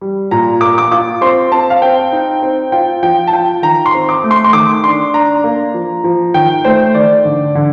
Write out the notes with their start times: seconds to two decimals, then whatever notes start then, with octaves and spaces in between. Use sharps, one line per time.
0.01 G3
0.31 A#2 A#5
0.61 A#3 D6
0.78 D6
0.91 F4 D6
1.21 C4 C6
1.52 C4 A5
1.70 F5
1.82 C4 G5
2.12 D#4
2.42 C4
2.72 F4 G5
3.03 F3 G5
3.27 A5
3.33 F4 G5
3.62 D#3 A#5
3.86 C6
3.94 C4
4.09 D6
4.23 A3
4.31 C6
4.44 C6
4.53 D#3 D6
4.84 D4 C6
5.14 D4 A#5
5.44 A#3
5.74 F3
6.04 F3
6.34 D#3 G5
6.65 A3 C5
6.95 D#3 D5
7.25 D3
7.55 D3